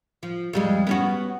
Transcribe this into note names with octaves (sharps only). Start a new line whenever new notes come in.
F3
F2 G3 G#3
B3 C#4 F#4